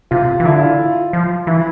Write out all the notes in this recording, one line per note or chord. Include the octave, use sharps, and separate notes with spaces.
C3 F4
E3
D3 E4
F4
F3
E3 E4